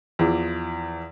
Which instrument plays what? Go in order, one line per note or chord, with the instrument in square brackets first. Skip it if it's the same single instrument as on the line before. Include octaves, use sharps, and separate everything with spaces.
[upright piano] E2 E3 F3